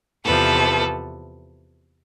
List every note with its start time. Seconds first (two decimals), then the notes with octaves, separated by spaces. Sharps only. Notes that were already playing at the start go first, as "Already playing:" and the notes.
0.24 E2 C3 F3 A4 B4